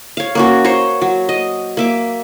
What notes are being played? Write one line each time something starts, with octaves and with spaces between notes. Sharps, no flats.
C#5 F5
A#3 C#4 F#4
C5 C#5 A#5
F#3
D#5
A#3 E5 D6